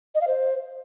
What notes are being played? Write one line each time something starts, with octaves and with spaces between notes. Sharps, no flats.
D#5
F5
C5